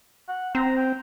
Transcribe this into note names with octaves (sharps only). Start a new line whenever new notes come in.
F#5
C4 A#5
G5